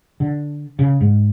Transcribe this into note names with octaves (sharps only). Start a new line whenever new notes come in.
D3
C#3
G#2